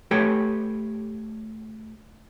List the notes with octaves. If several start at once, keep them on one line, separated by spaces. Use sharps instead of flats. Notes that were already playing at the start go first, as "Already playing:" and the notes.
A3 G4 A4 B4 C#5 G5